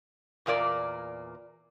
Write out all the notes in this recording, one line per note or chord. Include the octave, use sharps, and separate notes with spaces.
E2 A#2 A#3 D5